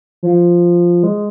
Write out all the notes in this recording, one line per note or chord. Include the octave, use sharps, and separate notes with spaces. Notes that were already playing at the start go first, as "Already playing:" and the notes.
F3
G#3